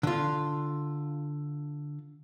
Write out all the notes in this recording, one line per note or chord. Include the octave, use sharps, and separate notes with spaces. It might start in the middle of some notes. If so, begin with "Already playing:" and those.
D3 F4